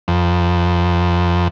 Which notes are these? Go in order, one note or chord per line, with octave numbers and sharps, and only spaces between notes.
F2